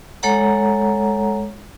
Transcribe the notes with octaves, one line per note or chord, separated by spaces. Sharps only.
G#3 A4 C#5 F#5 A#5